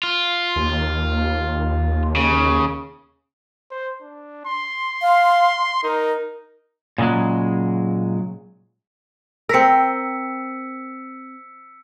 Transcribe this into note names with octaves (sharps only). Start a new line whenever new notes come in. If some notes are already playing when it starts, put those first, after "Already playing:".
F4
D#2
C#3
C5
D4
C6
F5
D#4 A#4
A#2 C#3 F3 F#3 G#3
C4 A#4 E6 B6 C#7